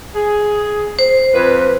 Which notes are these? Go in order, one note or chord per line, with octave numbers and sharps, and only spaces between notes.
G#4
C5
F2 B4